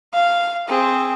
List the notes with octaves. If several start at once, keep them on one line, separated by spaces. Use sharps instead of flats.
F5
C4 G#4